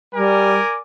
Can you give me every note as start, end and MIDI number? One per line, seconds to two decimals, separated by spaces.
0.14 0.59 55
0.14 0.79 70
0.14 0.79 74
0.14 0.79 80